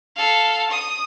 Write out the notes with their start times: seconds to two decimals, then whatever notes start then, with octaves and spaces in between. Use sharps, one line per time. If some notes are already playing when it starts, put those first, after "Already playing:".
0.16 A4 F5
0.70 D#6